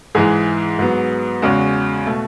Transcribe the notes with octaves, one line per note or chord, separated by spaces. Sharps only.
G#2 E3 G#3 G#4
G#2 F#3 B3
E2 C#3 G#3 F#4
B2 A3